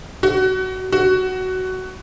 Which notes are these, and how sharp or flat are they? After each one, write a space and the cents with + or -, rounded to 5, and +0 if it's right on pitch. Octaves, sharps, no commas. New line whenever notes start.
F#4 +20
F#4 +10